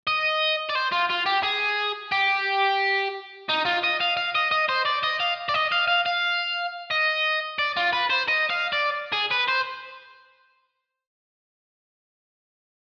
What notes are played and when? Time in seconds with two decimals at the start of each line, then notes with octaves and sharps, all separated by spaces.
0.07 D#5
0.70 D5
0.75 C5
0.92 F4
1.10 F4
1.26 G4
1.43 G#4
2.12 G4
3.50 D#4
3.66 F4
3.84 D#5
4.01 F5
4.17 F5
4.35 D#5
4.51 D#5
4.69 C5
4.85 D5
5.03 D#5
5.20 F5
5.49 D5
5.54 D#5
5.72 F5
5.88 F5
6.06 F5
6.91 D#5
7.59 D5
7.77 F4
7.93 B4
8.10 C5
8.28 D#5
8.50 F5
8.72 D5
9.12 G#4
9.31 B4
9.48 C5